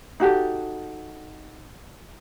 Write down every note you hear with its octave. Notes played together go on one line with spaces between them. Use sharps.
D#4 F#4 G4 A4